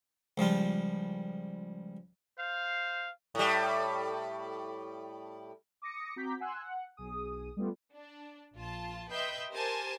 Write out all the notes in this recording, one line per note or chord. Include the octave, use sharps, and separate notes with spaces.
C#2 F3 G3 F4
C5 F5
A2 G3
D6 D#6 A#6 C#7
C4 F#4 A#5 D6 G6 B6
F#5 G#5 C6 E6 F#6
F#5
B1 G#4 D#6
G3 A3 B3 F4
D4
A#1 F4 A5
B4 D#5 E5 G5 C6 G6
G4 A#4 C5 G#5 A5